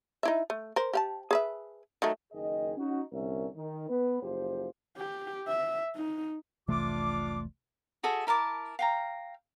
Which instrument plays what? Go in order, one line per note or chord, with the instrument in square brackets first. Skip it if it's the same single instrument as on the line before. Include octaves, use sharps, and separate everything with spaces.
[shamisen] D#4 E4 E5
A3
A#4 C5
G4 F5 A5
G#4 B4 E5
D#3 F#3 A3
[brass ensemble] F#1 D#3 G#4 D#5
C#4 D#4 F#4
C2 D3 C#4 A#4 E5
D#3
B3 B4
F#1 F3 G4 C5
[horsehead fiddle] G4
E5
D#4
[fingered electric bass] F1 C2 E3 [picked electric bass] C3 A3 [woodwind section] D4 F4 D6
[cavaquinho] F#4 G#4 A4 E5
E4 A#4 A5 D6
F5 G5 A#5